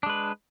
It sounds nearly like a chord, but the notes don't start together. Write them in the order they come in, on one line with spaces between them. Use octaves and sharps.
D4 G#3 B4